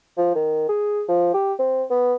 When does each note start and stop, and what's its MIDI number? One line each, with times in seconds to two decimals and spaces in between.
0.17 0.31 53
0.35 0.68 51
0.68 1.03 68
1.08 1.29 53
1.34 1.53 67
1.59 1.84 60
1.90 2.15 59